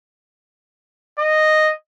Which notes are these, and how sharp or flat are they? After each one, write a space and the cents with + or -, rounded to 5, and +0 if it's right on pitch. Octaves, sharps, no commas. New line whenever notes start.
D#5 -5